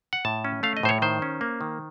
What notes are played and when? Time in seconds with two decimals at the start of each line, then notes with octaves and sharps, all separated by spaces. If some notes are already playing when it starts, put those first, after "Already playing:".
0.13 F#5
0.25 A2 A5
0.44 C#4
0.63 A3 F5
0.77 D#5
0.83 A2 C5
0.89 C#5
1.02 D#3 C5
1.22 C#4
1.41 A#3
1.61 D#3